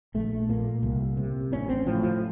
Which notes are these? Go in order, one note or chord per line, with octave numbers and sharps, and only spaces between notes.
A#1 A3
A#2 A#3
C2
C3
A1 C#4
C4
A2 F3
F3